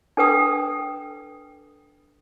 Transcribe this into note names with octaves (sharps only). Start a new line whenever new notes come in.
D4 A4 B4 G5 D#6